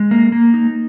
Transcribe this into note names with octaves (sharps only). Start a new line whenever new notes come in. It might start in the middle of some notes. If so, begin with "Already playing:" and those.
Already playing: G#3
A#3
A#3
D#4